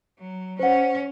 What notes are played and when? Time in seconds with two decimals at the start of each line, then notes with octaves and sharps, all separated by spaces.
0.19 F#3
0.59 C#4 C5 F#5